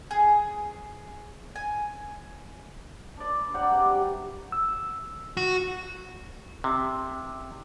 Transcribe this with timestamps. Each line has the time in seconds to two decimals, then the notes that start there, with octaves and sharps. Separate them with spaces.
0.11 G#4
1.56 G#5
3.17 D4 B4 D5
3.54 D5 F#5 G5 A#5
3.71 C3 G3
3.90 F#3
4.52 E6
5.37 F#4
6.64 C3